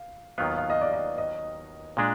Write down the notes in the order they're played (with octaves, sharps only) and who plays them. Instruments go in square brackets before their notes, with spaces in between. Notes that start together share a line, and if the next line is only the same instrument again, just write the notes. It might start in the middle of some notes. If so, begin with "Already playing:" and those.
Already playing: [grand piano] F5
[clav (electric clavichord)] D#2 D#3 F#3 B3 F4 [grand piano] F5
[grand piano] F5
D#5
D5
D#5
D#5
[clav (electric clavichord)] A#2 G#3 D4